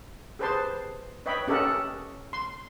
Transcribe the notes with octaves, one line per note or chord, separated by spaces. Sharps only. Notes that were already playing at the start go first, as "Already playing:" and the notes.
G4 G#4 B4 C5 A5 C6
B4 C#5 D#5 E5 G5 B5
C#4 G4 A4 A#4 D#5 F#5
C6